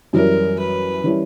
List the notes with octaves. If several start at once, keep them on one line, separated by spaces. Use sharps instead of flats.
F#2 E3 G3 C#4 E4 A#4
B4
E3 G3 C#4 E4